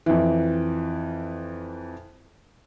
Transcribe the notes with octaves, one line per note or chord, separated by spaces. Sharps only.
F2 E3